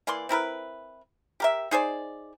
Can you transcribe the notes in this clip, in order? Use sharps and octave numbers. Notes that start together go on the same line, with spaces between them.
E3 A#3 D5 C6
C4 E4 A#4 B4
G4 A#4 E5
D#4 G#4 C5 D5